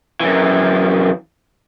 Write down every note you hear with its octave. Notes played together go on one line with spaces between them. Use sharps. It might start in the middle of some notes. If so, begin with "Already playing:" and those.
F#2 E3